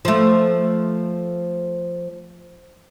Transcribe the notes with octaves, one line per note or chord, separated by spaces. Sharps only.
F3 A3